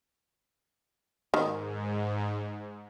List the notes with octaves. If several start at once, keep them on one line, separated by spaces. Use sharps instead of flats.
G#2 D#3